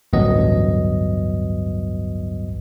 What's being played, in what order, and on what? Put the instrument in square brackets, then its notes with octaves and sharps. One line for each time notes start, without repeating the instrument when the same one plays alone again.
[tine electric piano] A1 D2 G2 F#3 B3 D#5